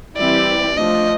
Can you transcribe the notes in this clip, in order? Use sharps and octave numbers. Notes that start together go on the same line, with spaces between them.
E3 G3 C4 E4 G4 D5
F3 A3 D4 D#5